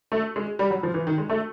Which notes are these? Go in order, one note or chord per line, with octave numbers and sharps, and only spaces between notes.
A3
G#3
G3
F#3
F3
E3
D#3
G#3
A3